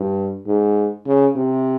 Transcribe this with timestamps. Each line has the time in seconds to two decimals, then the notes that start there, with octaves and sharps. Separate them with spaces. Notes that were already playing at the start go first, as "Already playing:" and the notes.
Already playing: G2
0.47 G#2
1.06 C#3
1.36 C3